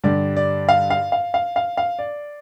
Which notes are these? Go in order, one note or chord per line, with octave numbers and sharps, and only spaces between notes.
G2 D3 G3 D5
D5
F5
F5
F5
F5
F5
F5
D5